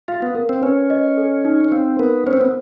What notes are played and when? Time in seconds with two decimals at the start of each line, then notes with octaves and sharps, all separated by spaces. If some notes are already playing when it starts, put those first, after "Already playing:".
0.08 F4 F5
0.22 B3
0.35 A#4
0.49 C4
0.63 C#4 B4
0.90 D#5
1.17 A4
1.45 D#4
1.65 C#4
1.72 C4 F5
1.99 B3 A#4
2.26 C#4 C5
2.33 C4
2.41 B3